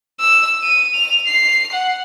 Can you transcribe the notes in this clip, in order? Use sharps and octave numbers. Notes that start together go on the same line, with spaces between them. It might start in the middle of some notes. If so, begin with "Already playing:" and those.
E6
D#7
F7
C7
F#5